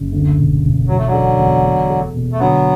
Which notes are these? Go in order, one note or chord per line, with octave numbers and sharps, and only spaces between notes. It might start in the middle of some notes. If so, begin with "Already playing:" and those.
Already playing: F#1
D2
E1
E1
E3 F#3
A3
D3 F#3
A4
E2
A3
A4
B2
A3
D3 F#3 B3